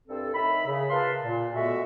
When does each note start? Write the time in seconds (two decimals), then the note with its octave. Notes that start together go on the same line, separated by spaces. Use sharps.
0.08 C2 G2 C4 A4
0.34 A2 D#3 E5 B5
0.67 C#3
0.90 F4 A#4 B4 F5 A5 C6
1.23 A#2
1.55 G#3 A3 B3 F#4 E5